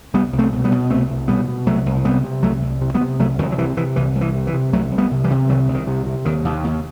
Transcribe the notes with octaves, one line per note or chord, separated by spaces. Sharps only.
C2 G3 B3
C2
A3 C4
B2
G3 B3
B2
C2 A3 C4
C2
B2 G3 B3
B2
C2 F#3 A3
C2
C3 G3 B3
C3
C2 F#3 A3
C2
C3
G3 B3
C3
C2 F#3 A3
C2 D#3 F#3
F#3
C3 E3
C3 E3
C2 E3
C2
E3
C3
E3
C3
C2 F#3 A3
C2
G3 B3
C3
E3 G3
C3
C2 D#3 F#3
C2
D#3
C3
C3
D#2 D#3
D#2
D#2